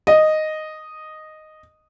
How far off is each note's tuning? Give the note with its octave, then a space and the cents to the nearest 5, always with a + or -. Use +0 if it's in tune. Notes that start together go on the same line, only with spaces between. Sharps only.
D#5 -5